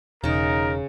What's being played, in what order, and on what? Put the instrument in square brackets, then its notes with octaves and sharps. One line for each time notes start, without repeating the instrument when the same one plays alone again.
[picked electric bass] E1 [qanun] C#3 C#6 [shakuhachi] D#4 [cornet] A#4